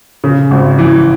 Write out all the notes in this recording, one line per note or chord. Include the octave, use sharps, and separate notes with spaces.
C#3
G#1
E3